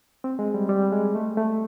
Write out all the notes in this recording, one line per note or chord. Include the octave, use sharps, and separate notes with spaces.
C4
G#3
G3
G3
G#3
A3
A3